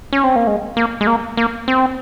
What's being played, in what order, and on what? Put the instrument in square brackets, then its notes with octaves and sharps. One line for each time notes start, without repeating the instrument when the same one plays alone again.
[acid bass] C#4
C4
A#3
G#3
A#3
G#3
A#3
A#3
C4